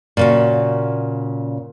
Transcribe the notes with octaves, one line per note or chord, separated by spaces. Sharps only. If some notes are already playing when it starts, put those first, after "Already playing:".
A#2 C#3 F#4